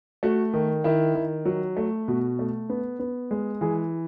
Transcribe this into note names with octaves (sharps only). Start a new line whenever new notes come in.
A3 F#4
D#3
D#3 E4
D#3
F#3
A3
B2 F#4
A3
B3
B3
G#3
E3 G#4